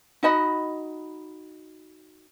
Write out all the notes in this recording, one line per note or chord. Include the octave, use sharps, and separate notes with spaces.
D#4 F#4 D#5 B5